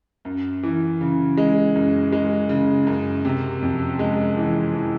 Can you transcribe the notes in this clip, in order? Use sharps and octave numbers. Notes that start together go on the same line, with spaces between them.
F#2
E3
C#3
G#3
F#2
G#3
C#3
F#2
C3
F2
G#3
E3
E3